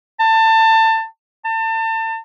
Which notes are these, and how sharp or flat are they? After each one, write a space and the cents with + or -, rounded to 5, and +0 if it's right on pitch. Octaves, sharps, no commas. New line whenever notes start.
A5 +25
A5 +35